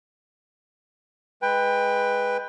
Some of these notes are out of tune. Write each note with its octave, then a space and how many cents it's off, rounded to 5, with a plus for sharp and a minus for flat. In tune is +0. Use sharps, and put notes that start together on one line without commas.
G#3 +0 B4 +0 G5 +20